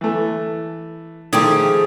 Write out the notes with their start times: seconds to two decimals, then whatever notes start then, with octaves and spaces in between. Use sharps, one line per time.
0.01 E3 A3
1.33 D#3 F3 A3 G4 G#4